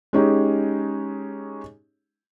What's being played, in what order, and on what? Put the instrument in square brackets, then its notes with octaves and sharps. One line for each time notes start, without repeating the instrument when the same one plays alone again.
[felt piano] G#3 C#4 D#4 G4